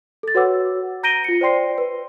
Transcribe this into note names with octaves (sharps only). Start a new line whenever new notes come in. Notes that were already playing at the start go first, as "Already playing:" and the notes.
A4 A6
F#4 B4 C#5 F#5 D6 E6
A#5 G6 A#6 D7 D#7 G7
F4 C#7
C5 D5 G5 C6 C7
B4